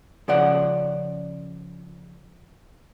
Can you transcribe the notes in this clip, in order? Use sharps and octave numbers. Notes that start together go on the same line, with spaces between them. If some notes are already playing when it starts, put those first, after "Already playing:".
C#3 F3 D5 F#5